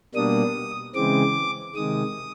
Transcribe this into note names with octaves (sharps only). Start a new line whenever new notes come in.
B2 G3 A#3 D4 D#6
C#3 E3 G#3 C4 D6
C3 D#3 G#3 D#6